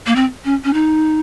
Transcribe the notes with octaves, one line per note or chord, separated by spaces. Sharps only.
A#3
C4
C#4
C#4
D#4